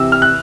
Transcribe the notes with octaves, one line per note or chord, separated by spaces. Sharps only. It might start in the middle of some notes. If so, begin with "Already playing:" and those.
Already playing: C3 E3 E6
F6
F#6